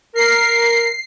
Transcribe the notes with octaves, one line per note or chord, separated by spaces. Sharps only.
A#4 C7